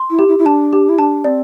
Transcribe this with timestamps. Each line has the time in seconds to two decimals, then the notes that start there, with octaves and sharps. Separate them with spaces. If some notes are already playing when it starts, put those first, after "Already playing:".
Already playing: C6
0.10 E4
0.19 G4
0.28 E4
0.39 E4
0.46 D4 A5
0.73 G4
0.89 E4
0.98 D4 A5
1.24 C4 D5